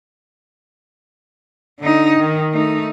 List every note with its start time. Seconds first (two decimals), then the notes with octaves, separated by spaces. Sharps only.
1.80 D3 D#4
2.18 D#3
2.53 A3 D#4